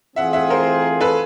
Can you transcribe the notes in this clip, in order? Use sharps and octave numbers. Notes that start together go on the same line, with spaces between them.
E3 A3 C4 F4 G#4 E5 F#5
E5 F#5
A#4 C5
A4 B4